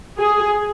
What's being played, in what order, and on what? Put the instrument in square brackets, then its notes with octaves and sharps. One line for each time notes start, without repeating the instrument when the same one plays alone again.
[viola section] G#4